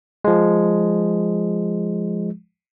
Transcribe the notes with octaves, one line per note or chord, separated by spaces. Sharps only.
F3 G#3